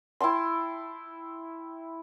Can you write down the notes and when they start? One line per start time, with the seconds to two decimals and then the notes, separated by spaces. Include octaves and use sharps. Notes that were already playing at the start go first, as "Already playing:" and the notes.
0.20 E4 G5 A5 C6